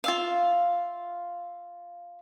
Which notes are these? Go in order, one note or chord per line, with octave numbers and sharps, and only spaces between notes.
F4 E5 F5